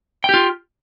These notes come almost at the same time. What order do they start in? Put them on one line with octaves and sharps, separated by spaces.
G5 G4 F4